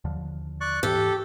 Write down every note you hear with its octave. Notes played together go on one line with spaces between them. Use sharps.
D#2 D3 F3
D5 C#6 F#6
G#2 E3 G4 A4